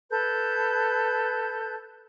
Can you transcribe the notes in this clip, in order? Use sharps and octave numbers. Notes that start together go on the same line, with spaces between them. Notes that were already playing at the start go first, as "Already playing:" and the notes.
A4 B4 G6